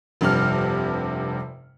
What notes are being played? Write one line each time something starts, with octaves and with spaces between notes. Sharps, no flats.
F1 G2 C3 F6